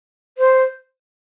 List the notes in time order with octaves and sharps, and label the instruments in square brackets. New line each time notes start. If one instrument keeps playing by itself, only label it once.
[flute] C5